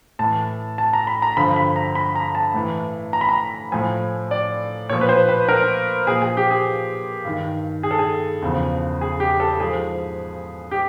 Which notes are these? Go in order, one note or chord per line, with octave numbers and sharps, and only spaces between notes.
A2 E3 A5
A5
A#5
B5
A#5
G2 D3 F3 B5
B5
A#5
B5
A#5
A5
A2 E3
A#5
B5
A#5
A2 F3 G#5
D5
A#2 F3 C#5
B4
C5
B4
A#4
A#2 F3 G#4
G#4
G4
G#4
G2 D#3
G#4
A4
G#4
E2 C#3 F3
G#4
G4
A4
G#2 F3 G#4
G4